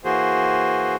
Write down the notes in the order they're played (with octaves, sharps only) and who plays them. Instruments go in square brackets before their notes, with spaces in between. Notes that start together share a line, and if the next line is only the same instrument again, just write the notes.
[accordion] E3 A#3 F#4 G#4 C5